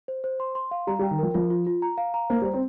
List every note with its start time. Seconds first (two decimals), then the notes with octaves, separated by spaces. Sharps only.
0.08 C5
0.24 C5
0.40 C6
0.55 C6
0.71 F5
0.87 G3 A#5
0.99 G3
1.03 G5
1.11 D#3
1.19 F3 A#4
1.34 F3 F4
1.50 F4
1.67 F4
1.82 A#5
1.98 F5
2.14 A#5
2.30 A#3 C5
2.42 G3
2.46 C5
2.54 C4